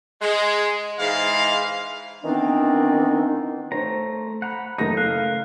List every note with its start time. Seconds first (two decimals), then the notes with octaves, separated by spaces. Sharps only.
0.21 G#3
0.98 G#2 E3 G#3 F5
2.24 D#3 E3 B3 C4 D4 D#4
3.72 A3 C5 A#5
4.42 F#5 A#5 B5
4.78 F#1 A3 D#4 A#6
4.97 F5 F#6